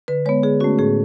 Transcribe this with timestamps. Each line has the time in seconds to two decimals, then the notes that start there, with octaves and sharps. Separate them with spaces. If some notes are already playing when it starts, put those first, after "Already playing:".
0.08 D3 B4
0.25 G#3 C#5
0.29 B3
0.43 D3 G#4
0.60 A3 C#4 F#4
0.79 A2 G#4